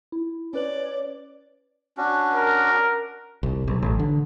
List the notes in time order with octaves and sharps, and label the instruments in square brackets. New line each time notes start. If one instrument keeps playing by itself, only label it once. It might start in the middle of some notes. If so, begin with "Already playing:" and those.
[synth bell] E4
[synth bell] C#4 B4 F#7 [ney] C#5 [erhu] D5
[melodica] C#4 D4 F#4
[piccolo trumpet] A#4
[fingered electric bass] C2
B1
A1
D3